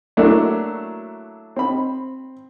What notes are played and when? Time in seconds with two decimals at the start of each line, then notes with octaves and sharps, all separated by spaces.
0.17 F#3 A3 A#3 D4 E4 F#4
1.56 C4 B5